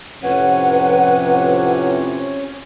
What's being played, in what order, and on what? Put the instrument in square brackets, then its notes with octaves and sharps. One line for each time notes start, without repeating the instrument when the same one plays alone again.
[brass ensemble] F2 A2 C3 [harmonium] C#4 C#5 [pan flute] B4 [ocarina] F#5